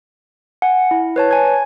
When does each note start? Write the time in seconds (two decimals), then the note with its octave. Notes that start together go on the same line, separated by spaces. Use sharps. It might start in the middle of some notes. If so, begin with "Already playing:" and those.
0.62 F#5 G#5
0.91 E4
1.16 B4 C#5 A5
1.31 G#5 G#6